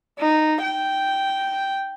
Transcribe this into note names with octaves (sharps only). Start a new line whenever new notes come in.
D#4
G5